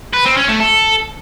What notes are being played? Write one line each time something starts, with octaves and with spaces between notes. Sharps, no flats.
B4
C4
C#4
A3
A4